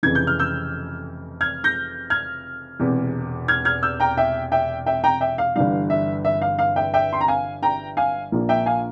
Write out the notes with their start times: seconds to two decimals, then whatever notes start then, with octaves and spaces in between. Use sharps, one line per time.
0.03 F1 F2 C#3 E3 G#6
0.15 G6
0.27 F6
0.39 E6 G6
1.41 F6 G#6
1.64 G6 A#6
2.10 F6 G#6
2.80 E1 E2 C3
3.48 F6 G#6
3.65 F6 G#6
3.83 E6 G6
4.00 G5 A#5
4.17 E5 G5
4.52 E5 G5
4.86 E5 G5
5.04 G5 A#5
5.21 E5 G5
5.38 F5
5.55 G1 G2 E3 G3 F5
5.90 E5
6.25 E5
6.42 F5
6.59 F5
6.76 E5 G5
6.94 E5 G5
7.13 C6
7.21 A#5
7.28 F5 G#5
7.63 G5 A#5
7.97 F5 G#5
8.32 A#1 A#2 F3 A#3
8.49 E5 G5
8.66 F5 G#5